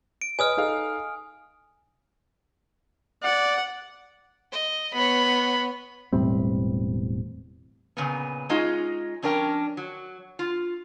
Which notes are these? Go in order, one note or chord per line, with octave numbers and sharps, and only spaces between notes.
D7
B4 C#5 D#5 G#5 D#6 F6
D#4 A4 F5
D5 F#5
D#5
B3 C#5 B5
E1 A2 G3 C4
A#2 C#3 A#3 B3
G#3 C#4 D#4 F4 G#4 D#5
F2 C#4 D4 A#4 G5
F#3
F4